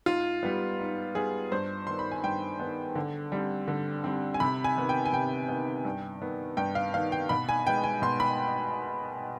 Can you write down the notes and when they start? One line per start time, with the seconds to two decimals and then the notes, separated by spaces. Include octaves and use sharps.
0.06 G#2 F4
0.43 G3 B3
0.79 G#2
1.15 G3 B3 G#4
1.52 G2 C5
1.87 D#3 B3 C6
1.99 B5
2.11 G#5
2.24 G2 G5
2.60 D#3 B3
2.95 D3
3.32 G3 C4
3.68 D3
4.04 G3 C4
4.34 G#5
4.40 C3 B5
4.64 G#5
4.76 D#3 B3
4.89 G5
5.06 G#5
5.13 C3 G5
5.48 D#3 B3
5.85 G2
6.22 D#3 B3
6.57 G2 G5
6.75 F5
6.94 D#3 B3 F5
7.12 G5
7.29 B2 B5
7.49 G#5
7.67 G#3 B3 G5
7.84 G#5
8.02 B2 C6
8.20 B5